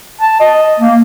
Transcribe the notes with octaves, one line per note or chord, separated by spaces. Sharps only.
A5
D#5
A#3